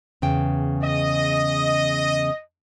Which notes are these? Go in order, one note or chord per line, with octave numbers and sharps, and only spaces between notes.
E2 C#3 G5
D#5